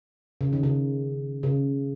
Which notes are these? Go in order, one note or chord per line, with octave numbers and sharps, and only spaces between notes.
C#3
D#3
C#3
C#3